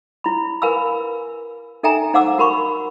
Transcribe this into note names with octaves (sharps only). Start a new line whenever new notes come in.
E4 B5
A#4 B4 F5 G#5 B5 E6
D#4 A4 E5 G5 G#5 A#5
D#4 C5 F5 F#5 D6 E6
F#4 A#4 B5 C#6